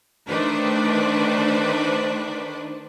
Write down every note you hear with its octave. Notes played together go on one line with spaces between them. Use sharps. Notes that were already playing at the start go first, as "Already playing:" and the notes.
D#3 A3 D4 B4 C5 D5